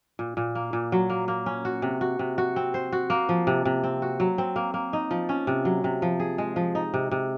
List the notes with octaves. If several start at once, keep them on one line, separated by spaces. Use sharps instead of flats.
A#2
A#2
A#3
A#2
F#3
A#3
A#3
C#4
F#4
C3
F#4
C3
F#4
C4
C5
F#4
A#3
F3
C3
C3
C4
F#4
F#3
C4
A#3
A#3
D#4
F3
C#4
C3
F#3
C3
F3
G#4
G#3
F3
D#4
C3
C3